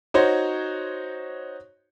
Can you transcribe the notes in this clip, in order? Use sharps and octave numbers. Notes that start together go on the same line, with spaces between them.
D#4 F#4 C5 C#5